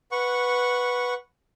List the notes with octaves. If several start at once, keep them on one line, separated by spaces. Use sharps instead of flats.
B4 F#5 C#6